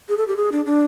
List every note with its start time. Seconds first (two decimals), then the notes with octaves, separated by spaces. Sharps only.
0.09 G#4
0.17 A4
0.28 G4
0.37 G#4
0.52 D4
0.66 D4